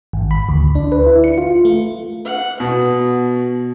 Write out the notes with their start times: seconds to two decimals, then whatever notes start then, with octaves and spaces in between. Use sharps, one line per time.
0.13 G#1
0.31 B5
0.49 D2
0.75 D4
0.92 B4
1.06 E4
1.24 C#7
1.38 F4
1.65 A3
2.25 F#5
2.60 B2 F#4